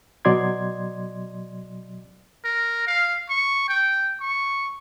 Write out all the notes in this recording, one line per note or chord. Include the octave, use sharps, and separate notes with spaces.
B2 F#3 D5 D#5 C6 G#6
A#4
F5
C#6
G5
C#6